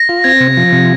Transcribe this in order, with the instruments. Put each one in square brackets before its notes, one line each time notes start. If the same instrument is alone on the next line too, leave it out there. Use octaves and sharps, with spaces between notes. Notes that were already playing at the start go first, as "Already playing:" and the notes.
Already playing: [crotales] A#6
[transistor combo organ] F4
[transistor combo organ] C4 [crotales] G#6
[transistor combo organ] C3
F3
C3